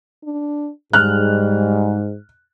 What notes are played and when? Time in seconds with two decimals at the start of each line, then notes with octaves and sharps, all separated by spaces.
0.24 D4
0.93 G#2 G3 F6 F#6